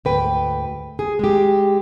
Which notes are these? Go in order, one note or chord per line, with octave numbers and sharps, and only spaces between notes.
D2 G#2 B4 G5
G#4
G#3 G4